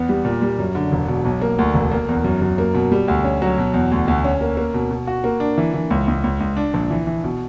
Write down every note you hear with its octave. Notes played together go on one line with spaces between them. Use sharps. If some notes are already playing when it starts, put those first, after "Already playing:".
Already playing: E2 B3
G3
A#2
G3
F#2
D3
E1
B2
B1
A#3
D2
E1
A#3
E2
F#2
F#2
A#3
B2
G3
D2
C#4
F#3
B2
E2
D2
D2
C#4
A#3
A#3
B2
B2
F#4
A#3
D4
E3
E3
C#2
C#2
C#2
C#2
D4
A#1
E3
E3
B2